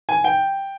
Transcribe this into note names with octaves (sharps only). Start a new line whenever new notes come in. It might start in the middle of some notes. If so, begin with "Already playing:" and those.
G#5
G5